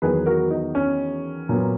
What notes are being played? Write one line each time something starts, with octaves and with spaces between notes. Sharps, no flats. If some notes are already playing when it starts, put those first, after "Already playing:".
E2 D#3 F#3 B3 G#4 B4
F#4 A#4
D#4
C#4
A#2 F#3 B3